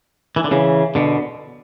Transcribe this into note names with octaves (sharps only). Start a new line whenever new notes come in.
E3
D3
C#3 E3
B2 D3